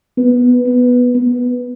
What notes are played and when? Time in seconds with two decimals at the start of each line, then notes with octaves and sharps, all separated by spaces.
0.18 B3
0.66 B3
1.15 B3